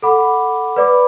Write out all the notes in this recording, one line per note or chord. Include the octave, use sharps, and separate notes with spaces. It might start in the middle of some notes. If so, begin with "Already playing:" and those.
A4 F#5 B5 D6
B4 D5 B5 D6